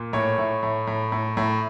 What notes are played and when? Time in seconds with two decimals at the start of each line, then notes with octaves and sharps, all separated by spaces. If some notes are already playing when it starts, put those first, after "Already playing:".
Already playing: A#2
0.13 A2 C#5
0.38 A2
0.63 A2
0.87 A2
1.12 A2
1.37 A2